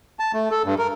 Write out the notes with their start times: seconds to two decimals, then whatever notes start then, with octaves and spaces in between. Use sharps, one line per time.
0.19 A5
0.33 A3
0.51 A4
0.65 G2
0.78 A#4